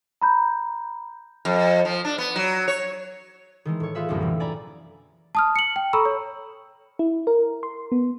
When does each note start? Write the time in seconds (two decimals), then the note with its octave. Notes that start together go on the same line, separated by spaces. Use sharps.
0.21 A#5 B5 G6
1.45 F2
1.85 F3
2.05 D4
2.18 B3
2.36 F#3
2.68 C#5
3.65 D#3 E3 G#3
3.80 A2 C#5
3.94 F4 G#4 B4 E5 F5
4.09 C2 F#2 A2 D3 A#3
4.21 B2 E3
4.40 D5 G#5 A#5 B5
5.35 A5 D#6 F6
5.56 C#7 F#7
5.76 G5
5.93 A4 A#5 B5 C#6 E6
6.05 C#5
6.99 E4
7.27 A#4
7.63 C6
7.92 B3